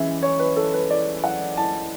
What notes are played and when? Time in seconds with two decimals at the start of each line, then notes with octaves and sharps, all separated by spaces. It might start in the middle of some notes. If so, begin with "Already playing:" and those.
Already playing: E3 G#3 C#4 E5
0.23 C#5
0.39 B4
0.56 A4
0.74 B4
0.90 D5
1.24 F#5
1.57 A5